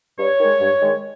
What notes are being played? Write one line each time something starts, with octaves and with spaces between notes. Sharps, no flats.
G2 C#5
D#3 G#3
G2
D#3 G#3